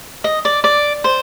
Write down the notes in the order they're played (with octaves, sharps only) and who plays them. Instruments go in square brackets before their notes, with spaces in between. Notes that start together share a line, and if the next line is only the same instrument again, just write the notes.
[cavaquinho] D#5
D5
D5
C5